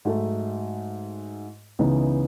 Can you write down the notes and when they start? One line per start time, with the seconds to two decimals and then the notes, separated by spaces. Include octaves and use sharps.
0.05 G#2 F#3 A3 D#4 A4
1.79 C#2 C#3 E3 B3 D#4